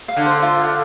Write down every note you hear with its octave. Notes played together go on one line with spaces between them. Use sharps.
F5
D3
C5
F4
F5